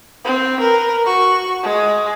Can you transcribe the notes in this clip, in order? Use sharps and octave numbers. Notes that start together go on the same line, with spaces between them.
C4
A#4 B4
F#4 C#6
G#3